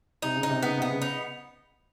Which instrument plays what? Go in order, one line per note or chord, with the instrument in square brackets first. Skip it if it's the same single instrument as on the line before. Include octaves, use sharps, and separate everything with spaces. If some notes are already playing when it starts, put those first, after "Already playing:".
[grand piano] C3 [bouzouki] D#4
[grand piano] C#3
[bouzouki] D#4
[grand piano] C3
[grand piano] C#3 [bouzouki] B3
[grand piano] C3 [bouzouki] B3
[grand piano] C#3
[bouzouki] D#4